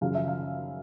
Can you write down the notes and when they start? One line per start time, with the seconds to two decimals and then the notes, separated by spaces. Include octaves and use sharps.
0.01 F#2 C#3 F3 F5
0.15 E5
0.28 F5